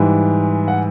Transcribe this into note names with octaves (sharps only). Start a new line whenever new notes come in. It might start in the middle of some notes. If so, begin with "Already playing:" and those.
Already playing: G#2 E3 G3
F#5